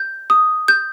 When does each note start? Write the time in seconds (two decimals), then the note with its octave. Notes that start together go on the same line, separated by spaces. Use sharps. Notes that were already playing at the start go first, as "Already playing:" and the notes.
Already playing: G6
0.30 D#6
0.68 G6